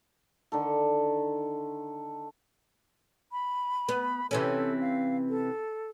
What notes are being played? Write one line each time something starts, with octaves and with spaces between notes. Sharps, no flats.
D3 D#3 A4
B5
B3
C3 E3 C#4 A4
F5
A4